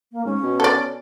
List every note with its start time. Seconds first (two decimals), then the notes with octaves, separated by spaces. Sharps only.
0.12 A#3
0.25 G#2 C#4
0.43 B2
0.60 A4 D5